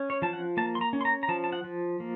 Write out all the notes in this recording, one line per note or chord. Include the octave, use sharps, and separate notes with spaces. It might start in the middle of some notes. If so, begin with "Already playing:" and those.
Already playing: C#4
C#5
F3 A5
F#5
A#3 A5
C6
A#5
C#4
C6
A#5
A#5
F3 A5
A5
F#5
F3
A#3